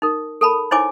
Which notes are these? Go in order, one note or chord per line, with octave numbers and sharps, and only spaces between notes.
D#4 A#4
A4 A#4 A5 B5
D#4 E4 C5 C#5 G#5 D6